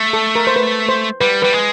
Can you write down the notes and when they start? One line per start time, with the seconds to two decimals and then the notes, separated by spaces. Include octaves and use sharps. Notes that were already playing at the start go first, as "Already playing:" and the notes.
Already playing: A3
0.13 A4
0.35 A#4
0.47 C5
0.56 B4
0.89 C5
1.21 G3 B4
1.42 G3 B4
1.53 G#3